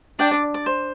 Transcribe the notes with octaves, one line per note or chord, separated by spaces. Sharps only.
D4 D5 G5
D5
D5
C5